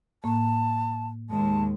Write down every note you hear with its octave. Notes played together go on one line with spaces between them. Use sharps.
A2 A#3 A5
D#2 G#3 A5